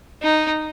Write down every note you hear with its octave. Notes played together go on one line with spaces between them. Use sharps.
D#4